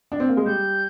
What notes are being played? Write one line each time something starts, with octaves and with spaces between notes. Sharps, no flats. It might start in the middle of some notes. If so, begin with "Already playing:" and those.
D4
C4
A#3
G#3
G3 G6